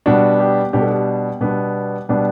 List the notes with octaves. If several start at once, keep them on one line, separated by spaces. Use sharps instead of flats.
B2 G3 B3 D4 F#4
G4
B2 G3 B3 D4 G4
A4
G4
B2 G3 B3 D4
B2 G3 B3 D4